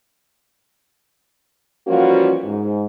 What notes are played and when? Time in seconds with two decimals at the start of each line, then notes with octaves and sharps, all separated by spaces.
1.87 E3 F3 G3 A#3 C#4 F#4
2.44 G#2